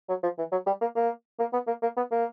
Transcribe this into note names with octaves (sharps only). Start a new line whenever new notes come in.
F#3
F3
E3
F#3
G3
A#3
A#3
A#3
B3
A#3
A#3
B3
A#3